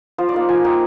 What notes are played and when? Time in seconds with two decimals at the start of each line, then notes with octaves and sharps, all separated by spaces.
0.18 F3 C5
0.29 D5
0.34 A#3 D#4
0.49 F3 G#5
0.64 A#3 D#4 G5